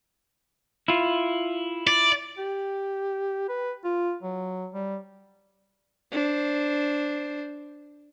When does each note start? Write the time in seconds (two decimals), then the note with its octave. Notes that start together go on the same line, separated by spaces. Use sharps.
0.88 E4 F4
1.87 D5
2.38 G4
3.49 B4
3.84 F4
4.23 F#3
4.74 G3
6.12 D4 C5